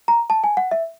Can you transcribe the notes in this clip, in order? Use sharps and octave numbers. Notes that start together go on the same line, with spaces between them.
A#5
A5
G#5
F#5
E5